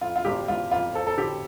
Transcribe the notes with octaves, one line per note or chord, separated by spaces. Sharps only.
F2 F4
F4
G1 G4
G1 F4
F2 F4
C4 A4
A4
D3 G4